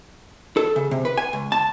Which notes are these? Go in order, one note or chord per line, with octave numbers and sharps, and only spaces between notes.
A4
C#3
C3
B4
G#5
C#2
A5